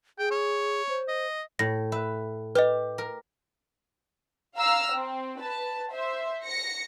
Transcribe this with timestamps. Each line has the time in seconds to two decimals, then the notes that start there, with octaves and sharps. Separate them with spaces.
0.19 G#4 G5
0.31 C#5
0.89 C5
1.08 D#5
1.59 A2 A#6
1.92 B4 E5
2.55 G4 B4 D#5
2.98 A#4
4.56 F5 A#5 E6 F6
4.93 C4
5.40 B4 A5
5.91 C5 E5
6.44 A#6 C#7